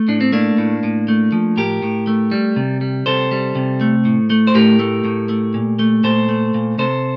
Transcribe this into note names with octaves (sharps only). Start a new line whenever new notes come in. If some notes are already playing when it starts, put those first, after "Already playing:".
Already playing: A3
A2 D4
C4
A3 A#3 D4
A2
A2
A3
F3
A2 G4 A#4
A2
A3
G3
C3
G3
C3 A4 C5
G3
C3
A3
A2
A3
C5
A2 G4 A#4
A3
A2
A3
A#2
A3
A#2 A4 C5
A3
A#2
C3 A4 C5